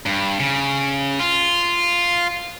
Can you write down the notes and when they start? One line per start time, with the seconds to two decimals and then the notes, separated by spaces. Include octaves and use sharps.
0.06 G2
0.40 C#3
1.20 F4